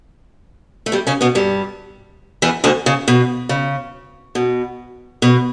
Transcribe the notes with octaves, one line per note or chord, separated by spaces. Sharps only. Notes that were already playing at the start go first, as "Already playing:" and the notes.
A3
G2 G3
C#3 C#4
B2 B3
G2 G3
E2 E3
D2 D3
C#3
B2
C#3
B2
B2